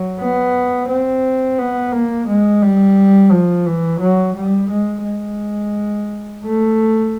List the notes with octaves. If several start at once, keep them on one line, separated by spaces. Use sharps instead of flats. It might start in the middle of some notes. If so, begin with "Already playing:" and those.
Already playing: F#3
B3
C4
B3
A#3
G#3
G3
F3
E3
F#3
G3
G#3
G#3
A3